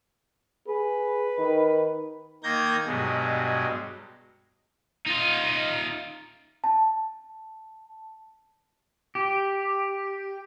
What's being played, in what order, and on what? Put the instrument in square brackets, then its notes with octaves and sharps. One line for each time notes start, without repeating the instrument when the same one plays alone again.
[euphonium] G#4 [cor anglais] B4
[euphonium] D#3
[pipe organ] D#3 A#3 G6 G#6 A#6
G2 B2 F#3 G#3
[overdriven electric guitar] D#4 F4
[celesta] A5
[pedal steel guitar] G4